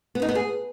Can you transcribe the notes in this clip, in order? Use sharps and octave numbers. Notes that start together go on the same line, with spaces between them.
B3
D#4
B3
G#4